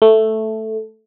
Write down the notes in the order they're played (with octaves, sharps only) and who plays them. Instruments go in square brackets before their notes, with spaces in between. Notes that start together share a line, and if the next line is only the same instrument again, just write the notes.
[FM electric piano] A3